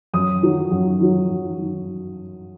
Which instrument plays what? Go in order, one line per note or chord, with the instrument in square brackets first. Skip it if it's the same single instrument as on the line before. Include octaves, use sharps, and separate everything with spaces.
[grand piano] F#2 D#6
D#3 F#3
F#2
D#3 F#3
F#2
D#3 F#3